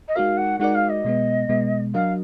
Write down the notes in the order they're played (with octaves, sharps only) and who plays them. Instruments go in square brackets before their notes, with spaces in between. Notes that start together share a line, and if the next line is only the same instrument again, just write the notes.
[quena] D#5
[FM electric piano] G#3 D#4 F#4 A#4 D5 [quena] F5
[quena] F#5
[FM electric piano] G#3 D#4 F#4 A#4 D5 [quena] F#5
[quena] F5
D#5
[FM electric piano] B2 G#3 B3
B2 G#3 B3
[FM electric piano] F#3 D4 F#4 A#4 D#5 [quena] F5